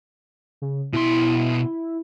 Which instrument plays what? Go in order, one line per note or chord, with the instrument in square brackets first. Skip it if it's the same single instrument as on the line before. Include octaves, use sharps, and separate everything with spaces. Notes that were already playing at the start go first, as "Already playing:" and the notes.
[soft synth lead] C#3
[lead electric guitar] B2 C6 [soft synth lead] E4